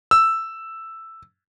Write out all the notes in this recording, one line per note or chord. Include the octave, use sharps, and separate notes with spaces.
E6